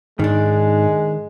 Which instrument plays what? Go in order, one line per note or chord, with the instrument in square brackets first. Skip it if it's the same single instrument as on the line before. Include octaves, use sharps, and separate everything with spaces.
[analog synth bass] G#2 [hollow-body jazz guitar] D#3 D4 [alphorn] G#3